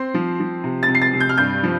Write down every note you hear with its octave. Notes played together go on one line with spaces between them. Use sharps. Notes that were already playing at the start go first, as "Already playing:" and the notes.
Already playing: C4 C6
F3
F3
C3
A6
C3
C7
A6
C3
G6
F6
G2 G6
F3